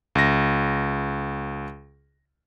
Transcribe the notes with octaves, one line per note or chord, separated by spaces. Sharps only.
C#2 A#6